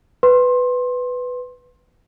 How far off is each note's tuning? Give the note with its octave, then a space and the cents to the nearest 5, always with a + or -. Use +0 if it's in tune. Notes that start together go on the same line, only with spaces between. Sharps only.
B4 +10 C6 +25